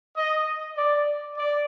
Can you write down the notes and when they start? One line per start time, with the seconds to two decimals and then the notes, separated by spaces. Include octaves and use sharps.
0.15 D#5
0.76 D5
1.36 D5